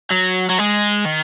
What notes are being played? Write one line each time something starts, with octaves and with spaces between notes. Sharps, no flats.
F#3
F#3
G#3
D#3